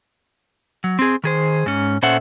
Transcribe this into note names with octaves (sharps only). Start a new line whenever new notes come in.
F#3
C4 G#4
D#3 G#4 C5
G#2 C#4
A#2 C#4 A4 C5 E5 F#5